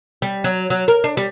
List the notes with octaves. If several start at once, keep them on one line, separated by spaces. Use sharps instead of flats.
G3
F#3
F#3
A#4
D4
G3